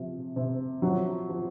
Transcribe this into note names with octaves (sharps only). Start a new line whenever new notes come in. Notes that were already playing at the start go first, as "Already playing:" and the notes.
Already playing: C3 F3
C3
F3 F#3
F3